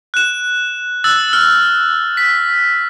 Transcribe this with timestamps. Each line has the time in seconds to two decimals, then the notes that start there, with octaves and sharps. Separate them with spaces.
0.14 F#6 E7
1.04 E6 F#6 A6
1.33 F6
2.17 B6